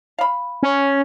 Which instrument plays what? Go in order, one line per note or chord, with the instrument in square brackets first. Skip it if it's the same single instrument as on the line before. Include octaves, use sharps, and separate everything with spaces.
[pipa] F5 B5
[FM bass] C#4